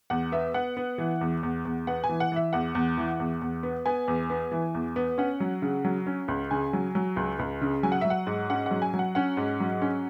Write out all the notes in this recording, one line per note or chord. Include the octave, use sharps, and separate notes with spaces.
E2 F#5
B3 E5
B3 F#5
B3
E3
E2
E2
E2
B3 F#5
G#5
E3
F#5
E3 E5
E2 F#5
E2
E3
E2
E2
B3
B3 G#5
E2
B3
E3
E2
B3
C#4 F#5
F#3
C#3
F#3
C#4
C#2
C#3 G#5
F#3
F#3
C#2
C#2
C#3
F#3 G#5
F#5
F#3 E5
F#5
G#2
C#4 F#5
F#3 F#5
G#5
F#3
F#5
C#4 F#5
G#2
F#3
C#4